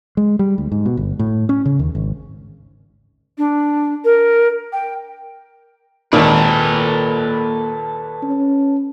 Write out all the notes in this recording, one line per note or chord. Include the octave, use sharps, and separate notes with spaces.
G#3
G3
D2
G#2
B2
G1
A2
C#4
C#3
D#2
G#1
D4
A#4
G5
G#1 D#2 A#2 A4 B4
A#3
C#4